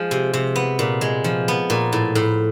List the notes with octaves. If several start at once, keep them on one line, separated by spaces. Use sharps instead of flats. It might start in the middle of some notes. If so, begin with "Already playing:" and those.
Already playing: F3 G#3
C3
C3
B3
A#2
G#3
F3
B3
A#2
A2
A2